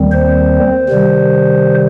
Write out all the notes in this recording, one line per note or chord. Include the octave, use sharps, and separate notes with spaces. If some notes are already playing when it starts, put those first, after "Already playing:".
Already playing: D#2 D#3 G3 C4
C5
C3 D#3 G3